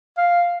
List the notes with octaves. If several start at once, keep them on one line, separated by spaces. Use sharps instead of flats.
F5